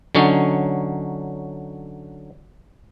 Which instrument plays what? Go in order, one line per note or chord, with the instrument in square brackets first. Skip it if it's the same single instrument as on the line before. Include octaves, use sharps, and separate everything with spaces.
[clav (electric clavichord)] D3 F#3 C#4 D#4